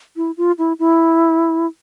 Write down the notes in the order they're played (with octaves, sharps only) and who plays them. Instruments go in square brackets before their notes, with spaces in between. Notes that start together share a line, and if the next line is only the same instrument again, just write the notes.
[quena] E4
F4
E4
E4